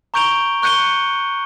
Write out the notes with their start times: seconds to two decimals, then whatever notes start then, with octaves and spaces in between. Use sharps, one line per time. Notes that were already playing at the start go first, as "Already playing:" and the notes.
0.14 A#5 C#6 G6 D7 F7 G7
0.62 C#6 F#6 G6 C#7 D#7 G7